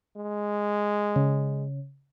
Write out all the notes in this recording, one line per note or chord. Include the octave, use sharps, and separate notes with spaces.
G#3
C#3